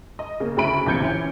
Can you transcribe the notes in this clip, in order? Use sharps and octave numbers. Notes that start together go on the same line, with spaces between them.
D#5
C#3 A#3
D2 C#3 E4 B5 D7
A#1 C3 E3 G6 G#6 C#7
E3 C#4